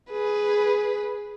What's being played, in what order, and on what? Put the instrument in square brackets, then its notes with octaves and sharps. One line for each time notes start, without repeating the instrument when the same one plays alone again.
[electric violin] G#4 B4